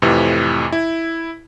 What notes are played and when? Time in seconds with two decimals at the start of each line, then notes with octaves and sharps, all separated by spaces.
0.02 F2 A2 C3 E3
0.72 E4